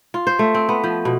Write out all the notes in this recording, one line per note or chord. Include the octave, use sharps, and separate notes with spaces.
F4
C5
A3
C4
B3
F3
B2